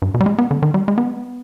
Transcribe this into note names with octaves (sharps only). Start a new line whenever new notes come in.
G2
B2
G3
G#3
B3
D3
D#3
G3
G#3
B3